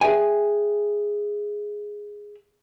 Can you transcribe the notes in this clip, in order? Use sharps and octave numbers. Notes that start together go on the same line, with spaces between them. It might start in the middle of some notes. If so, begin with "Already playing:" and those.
G#4 E5 G5 G#5